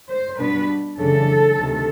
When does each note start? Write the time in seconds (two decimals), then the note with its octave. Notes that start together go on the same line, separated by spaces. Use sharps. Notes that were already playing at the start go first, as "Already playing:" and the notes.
0.09 C5
0.38 B2 G3 B3 D4 B4
0.97 F#2 C#3 E3 A3 D4 A4
1.56 D2 C3 D#3